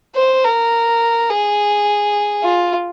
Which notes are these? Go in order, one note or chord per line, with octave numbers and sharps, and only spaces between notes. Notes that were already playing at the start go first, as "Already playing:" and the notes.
C5
A#4
G#4
F4